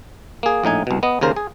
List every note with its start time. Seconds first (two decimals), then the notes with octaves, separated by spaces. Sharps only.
0.43 A#3 G#4
0.63 A#1 A2 D#4 G#5
0.87 C2 B2
1.03 B3 D#5
1.21 D#2 C#3 A#4 C5
1.36 G#4